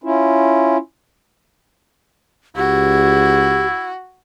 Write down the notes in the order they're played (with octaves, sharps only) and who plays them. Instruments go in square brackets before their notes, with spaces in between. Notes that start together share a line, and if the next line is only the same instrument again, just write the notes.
[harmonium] C#4 E4 F4
[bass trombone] C#2 [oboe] E4 [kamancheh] F#4 [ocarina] G4